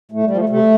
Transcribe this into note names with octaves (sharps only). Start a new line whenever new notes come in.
A2 A3
G3
F3
A3
C3 A3